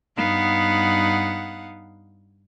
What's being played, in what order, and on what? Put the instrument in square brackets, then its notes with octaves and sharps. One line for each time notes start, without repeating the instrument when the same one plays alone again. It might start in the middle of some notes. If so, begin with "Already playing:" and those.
[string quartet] G2 B3 D#4 F5 F#5